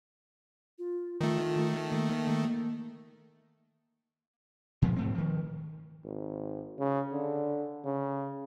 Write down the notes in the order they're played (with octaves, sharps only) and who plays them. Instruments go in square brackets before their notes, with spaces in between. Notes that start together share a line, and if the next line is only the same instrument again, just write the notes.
[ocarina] F4
[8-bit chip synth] D#3 A3 [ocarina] F4
[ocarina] A#3
[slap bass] A#2 F3 G#3 B3
G#2 A3 C4
D#3 F3
[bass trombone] G#1
C#3
D3
C#3